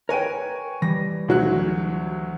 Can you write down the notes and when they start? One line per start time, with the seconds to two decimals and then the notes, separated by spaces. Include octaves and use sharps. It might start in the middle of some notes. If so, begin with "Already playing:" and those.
0.09 A#4 B4 C#5 G5 G#5 D#7
0.82 E3 G3 A#6
1.28 D2 F#3 F#6